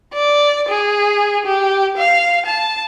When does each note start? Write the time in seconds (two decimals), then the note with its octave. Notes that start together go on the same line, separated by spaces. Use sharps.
0.14 D5
0.68 G#4
1.45 G4
1.97 F5
2.46 A5